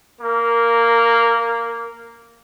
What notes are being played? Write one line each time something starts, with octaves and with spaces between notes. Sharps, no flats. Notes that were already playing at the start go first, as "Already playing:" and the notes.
A#3 A#4